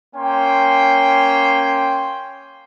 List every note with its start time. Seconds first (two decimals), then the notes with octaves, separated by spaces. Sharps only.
0.15 A#3 C#4 G5 C6